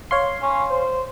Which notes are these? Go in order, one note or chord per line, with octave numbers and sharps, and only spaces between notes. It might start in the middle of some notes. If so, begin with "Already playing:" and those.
C#5 F5 C6
C#4
C5